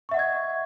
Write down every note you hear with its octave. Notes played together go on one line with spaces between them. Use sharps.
D#5 E5 F#5 C#6 G#6